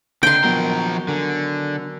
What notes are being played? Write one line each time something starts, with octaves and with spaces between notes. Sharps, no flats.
D3 D#3 C4 G5 C6
F3 F#3 B3 A#4
D3 A#4 G#5